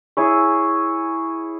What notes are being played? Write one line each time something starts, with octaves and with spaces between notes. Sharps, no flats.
E4 G#4 C#5 E5